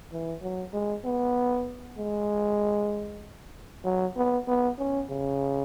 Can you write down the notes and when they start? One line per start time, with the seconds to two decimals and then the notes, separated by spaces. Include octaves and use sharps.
0.12 E3
0.42 F#3
0.74 G#3
1.05 B3
1.98 G#3
3.85 F#3
4.17 B3
4.48 B3
4.79 C#4
5.10 C#3